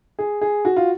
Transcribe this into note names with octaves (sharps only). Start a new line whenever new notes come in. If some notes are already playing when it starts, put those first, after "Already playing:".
G#4
G#4
F#4
F4